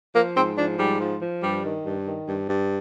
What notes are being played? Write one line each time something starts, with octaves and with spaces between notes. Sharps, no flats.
F3 A#3
G#2 C4
F3 D4
G#2 G3
F3
F3
G2 G3
D#3
G2
D#3
G2
G2